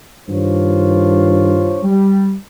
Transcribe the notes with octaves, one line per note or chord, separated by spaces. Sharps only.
G2 D#3 D4 F4 C5 C#5
G3